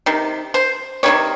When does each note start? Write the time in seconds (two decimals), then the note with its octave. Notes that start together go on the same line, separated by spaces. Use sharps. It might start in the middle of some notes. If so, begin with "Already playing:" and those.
0.06 C3 D#3
0.54 C5
1.03 C3 D#3 G3 C#5